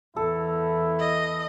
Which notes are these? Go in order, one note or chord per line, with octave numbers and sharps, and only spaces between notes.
E2 E4 A4
D#5